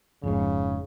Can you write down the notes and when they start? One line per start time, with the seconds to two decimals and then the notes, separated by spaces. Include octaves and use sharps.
0.23 F1 F2 G#2 C#3